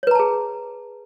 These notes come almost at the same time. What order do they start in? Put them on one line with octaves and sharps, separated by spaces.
C#5 B4 A#5 A5 G#4